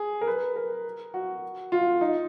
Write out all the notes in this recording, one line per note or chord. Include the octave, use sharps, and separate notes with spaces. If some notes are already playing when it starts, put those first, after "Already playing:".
Already playing: G#4
A#4
B4
A#4
F#4
F4
D#4